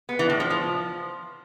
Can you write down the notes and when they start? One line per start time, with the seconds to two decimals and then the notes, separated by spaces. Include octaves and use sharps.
0.09 B3
0.19 E3
0.30 A2
0.40 F3
0.50 F3